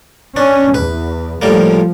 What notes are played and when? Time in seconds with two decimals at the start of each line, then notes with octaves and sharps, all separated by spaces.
0.36 C#4 D4
0.74 E2 B4
1.42 A2 F3 G3 A#3